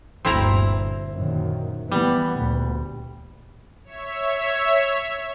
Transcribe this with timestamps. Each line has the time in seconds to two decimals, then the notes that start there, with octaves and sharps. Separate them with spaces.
0.25 G1 D2 A#2 C4 E4 A#5
1.13 F#2 A#2 D#3
1.91 E3 G3 B3
2.37 D2 A#2
3.84 C#5 E5